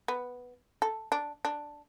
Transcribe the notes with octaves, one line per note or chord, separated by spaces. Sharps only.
B3
A4
D4
D4